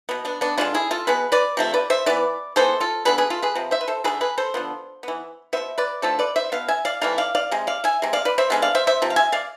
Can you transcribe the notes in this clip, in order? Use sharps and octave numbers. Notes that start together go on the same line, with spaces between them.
B2 B3
B3 D4
B3 D4
D3 G#3 B3 D4 F4
E4 G#4
F4 A4
B2 B3 G#4 B4
B4 D5
C3 F3 A3
B4 D5
C5 E5
E3 B3 B4 D5
E3 G#3 B3 A4 C5
F4 A4
D3 G#3 B3 G#4 B4
G#4 B4
F4 A4
G#4 B4
C3 F3
C5 E5
B4
A4 C5
D3 A3 G#4 B4
G#4 B4
A4 C5
D3 F3 B3
E3 B3
B2 B3 C5 E5
B4 D5
D3 F3 A3 A4 C5
B4 D5
C5 E5
B2 B3 F5
E5 G#5
D5 F5
C3 E3 A3 D5 F5
D5 F5
D5 F5
C3 G#3
D5 F5
E5 G#5
C3 G#3
D5 F5
B4 D5
C5 E5
D3 G#3 B3 F5
D5 F5
C5 E5
C5 E5
C3 F3
F5
E5 G#5
D5 F5